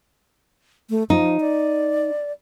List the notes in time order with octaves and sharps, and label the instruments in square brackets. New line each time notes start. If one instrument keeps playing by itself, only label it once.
[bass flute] A3
[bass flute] F3 [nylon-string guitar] D#4
[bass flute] D5